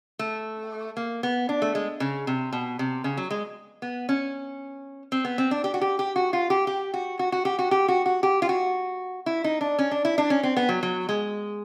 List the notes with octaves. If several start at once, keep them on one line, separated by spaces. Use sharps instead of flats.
A3
A#3
B3
D4
A3
G#3
C#3
C3
B2
C3
C#3
F#3
G#3
B3
C#4
C4
B3
C4
D4
G4
F#4
G4
G4
F#4
F4
G4
G4
F#4
F#4
F#4
G4
F#4
G4
F#4
F#4
G4
F4
F#4
E4
D#4
D4
C#4
D4
E4
D4
C#4
C4
B3
F#3
F#3
G#3